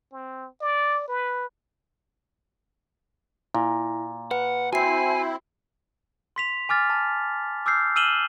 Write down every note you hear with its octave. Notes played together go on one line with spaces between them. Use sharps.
C4
D5
B4
A#2 E4
B4 F#5
C4 E4 F#4 G#5 C7
C6 B6 F7
G#5 D6 F6 A6
A5
D6 E6 F6 G6 C7
E6 F6 D#7 E7 F#7 G7